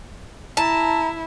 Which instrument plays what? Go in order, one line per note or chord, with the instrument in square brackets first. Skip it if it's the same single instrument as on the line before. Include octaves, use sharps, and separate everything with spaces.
[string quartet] E4 [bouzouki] A5 [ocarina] A#5